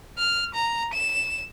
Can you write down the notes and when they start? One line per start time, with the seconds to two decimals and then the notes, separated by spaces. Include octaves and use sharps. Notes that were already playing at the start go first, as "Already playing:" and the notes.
0.18 F6
0.55 A#5
0.94 E7